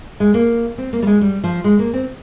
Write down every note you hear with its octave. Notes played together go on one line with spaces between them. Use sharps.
G#3
A#3
C4
A#3
G3
G#3
G3
F3
G#3
A#3
C4